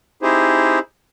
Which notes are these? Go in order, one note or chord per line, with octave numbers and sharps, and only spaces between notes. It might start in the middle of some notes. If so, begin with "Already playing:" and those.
C4 D#4 E4 G4 G#4 C5